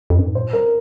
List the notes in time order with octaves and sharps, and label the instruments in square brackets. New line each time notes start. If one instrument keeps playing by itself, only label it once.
[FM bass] F2
G2
G#2
[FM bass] A#2 [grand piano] C5
[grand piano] A#4